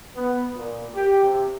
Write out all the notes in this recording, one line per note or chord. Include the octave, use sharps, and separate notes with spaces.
B3
A#2
G4
C3